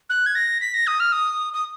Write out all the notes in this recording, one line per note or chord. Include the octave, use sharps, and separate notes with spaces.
F#6
G#6
A#6
B6
A#6
D#6
F6
D#6
D#6